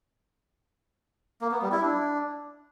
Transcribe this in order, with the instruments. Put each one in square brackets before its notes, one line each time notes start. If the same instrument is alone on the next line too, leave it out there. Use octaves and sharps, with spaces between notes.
[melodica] A#3
B3
G3
E4
D4